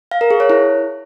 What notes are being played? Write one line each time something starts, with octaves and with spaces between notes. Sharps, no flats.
F5
A#4
G#4
C#5
E4